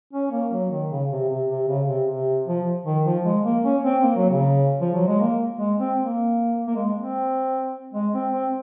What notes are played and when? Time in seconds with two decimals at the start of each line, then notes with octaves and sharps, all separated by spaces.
0.13 C#4
0.31 A#3
0.52 F#3
0.70 D#3
0.91 C#3
1.11 C3
1.29 C3
1.50 C3
1.68 C#3
1.88 C3
2.08 C3
2.47 F3
2.85 D#3
3.05 F3
3.25 G#3
3.44 A#3
3.64 C#4
3.84 C4
4.03 A#3
4.16 F#3
4.30 C#3
4.81 F3
4.95 F#3
5.07 G#3
5.20 A#3
5.59 G#3
5.79 C4
5.99 A#3
6.67 A#3
6.76 G#3
6.96 C4
7.94 G#3
8.13 C4
8.32 C4